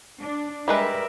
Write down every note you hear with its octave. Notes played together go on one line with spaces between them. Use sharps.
D4
G3 G#3 A#4 B4 E5